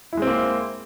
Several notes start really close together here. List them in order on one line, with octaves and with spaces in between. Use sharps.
E4 G#3 C4 A#3